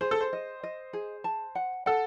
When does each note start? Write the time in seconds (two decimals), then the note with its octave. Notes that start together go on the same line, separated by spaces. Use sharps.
0.01 G#4 C5
0.11 A4
0.21 C5
0.33 D#5
0.63 D#5
0.93 G#4
1.24 A5
1.55 F#5
1.86 A4 F#5